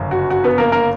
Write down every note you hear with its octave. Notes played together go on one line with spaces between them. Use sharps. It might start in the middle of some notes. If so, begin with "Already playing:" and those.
Already playing: G1 F#2 C#3
F#4
F#4
B3 B4
A#3 A#4
A#3 A#4